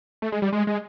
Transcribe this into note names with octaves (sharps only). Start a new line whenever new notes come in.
A3
G#3
G3
G#3
G#3